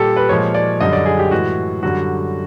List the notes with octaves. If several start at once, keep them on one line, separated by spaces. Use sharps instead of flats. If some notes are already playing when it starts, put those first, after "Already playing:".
Already playing: A#2 G3 G4 A4
B4
A#2 F3 G#3 C#5
D5
F#2 D3 G3 D#5
D5
G#4
G4
A2 E3 G#3 F#4
F#2 D3 G3 F#4